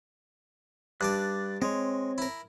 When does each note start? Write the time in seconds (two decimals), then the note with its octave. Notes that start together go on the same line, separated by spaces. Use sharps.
1.01 G2 D4 D5 F#6
1.62 G#3 C4 C#5
2.18 E4 A#4